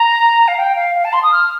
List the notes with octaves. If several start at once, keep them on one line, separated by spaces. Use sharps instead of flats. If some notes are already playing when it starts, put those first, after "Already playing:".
Already playing: A#5
F5
G5
F5
F5
A5
C6
D#6
F6